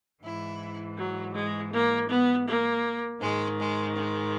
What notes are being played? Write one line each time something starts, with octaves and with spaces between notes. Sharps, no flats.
G#2 E3 E4
F#3
G#3
A#3
B3
A#3
G#2 D#3 G#3
G#3
G#3